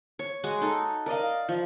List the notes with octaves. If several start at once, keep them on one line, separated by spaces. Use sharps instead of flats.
C#5
G#3 F#4
D#4 A4
A#4 D5 D#5 F5
F3